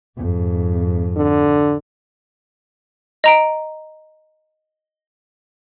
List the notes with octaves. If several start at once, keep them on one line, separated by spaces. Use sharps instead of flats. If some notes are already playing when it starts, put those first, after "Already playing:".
F2 G#2
D3
D#5 A#5 D7